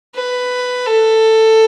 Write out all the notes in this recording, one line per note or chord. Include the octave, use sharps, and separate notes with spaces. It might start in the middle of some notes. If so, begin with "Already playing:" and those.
B4
A4